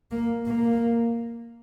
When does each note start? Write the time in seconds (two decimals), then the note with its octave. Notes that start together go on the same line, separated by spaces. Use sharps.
0.11 A#3
0.47 A#3